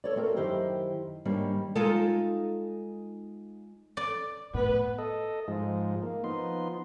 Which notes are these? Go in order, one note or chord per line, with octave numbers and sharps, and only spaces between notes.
A4 C#5 D5
A3 C4 F#4 A#4
F#2 D#3 E4 G4 C5 A#5
G#2 D#3 G3 A#3 C#4 D4
G#3 D#4 F4 A4
D5
A2 B3 B4
A4 D#5
G#2 F3 G#3
A#3
F3 B3 D#4 C6